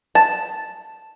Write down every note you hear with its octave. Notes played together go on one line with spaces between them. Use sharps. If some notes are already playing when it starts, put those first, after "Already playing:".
A5